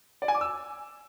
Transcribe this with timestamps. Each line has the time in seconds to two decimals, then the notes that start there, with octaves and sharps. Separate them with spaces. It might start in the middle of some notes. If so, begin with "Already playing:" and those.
0.22 D5
0.28 G#5
0.35 D6
0.41 E6